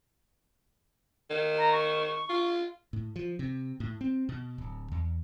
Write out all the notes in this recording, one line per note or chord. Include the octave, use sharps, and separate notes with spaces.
D#3
A#5
C#6
F4
A2
F3
C3
A2
C4
B2
D1
E2